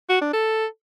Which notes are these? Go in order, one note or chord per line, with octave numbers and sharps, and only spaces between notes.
F#4
D4
A4